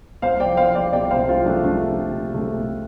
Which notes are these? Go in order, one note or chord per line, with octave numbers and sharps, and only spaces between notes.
C2 C5 F5
D5 G5
F3
C5 F5
F3
D5 G5
C2 D5 G5
C5 F5
C2
C4 F4
F3
A3 D4
C3 A3 D4
F3
C3
C3 A3
C2